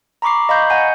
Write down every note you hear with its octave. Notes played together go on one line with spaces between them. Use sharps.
A#5 B5 C#6 D6 C7
D#5 F5 A#5 B5 C#6 G6
D#5 F#5 G#5 G6